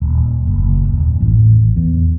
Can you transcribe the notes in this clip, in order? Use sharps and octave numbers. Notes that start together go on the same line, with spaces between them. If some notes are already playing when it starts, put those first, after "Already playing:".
D#1
F#1
D#1
A1
E2